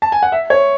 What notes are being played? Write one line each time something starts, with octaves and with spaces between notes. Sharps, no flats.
A5
G#5
F#5
E5
C#5